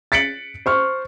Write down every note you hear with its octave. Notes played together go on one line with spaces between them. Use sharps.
A6 B6 C#7 D7 F#7
C5 C#6 F6